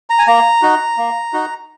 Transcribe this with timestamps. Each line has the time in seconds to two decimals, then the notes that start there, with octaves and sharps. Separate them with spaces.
0.10 A#5
0.19 G#5
0.27 A#3 A#5
0.62 D#4 F#4
0.98 A#3
1.33 D#4 F#4